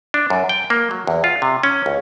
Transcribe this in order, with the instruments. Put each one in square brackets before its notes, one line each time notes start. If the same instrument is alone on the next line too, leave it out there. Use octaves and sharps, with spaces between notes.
[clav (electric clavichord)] D4
F#2
G5
A#3
F#3
E2
F4
C3
C#4
C#2